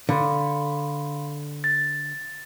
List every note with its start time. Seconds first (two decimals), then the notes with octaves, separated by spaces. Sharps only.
0.09 D3 F5 B5 C6
1.64 A6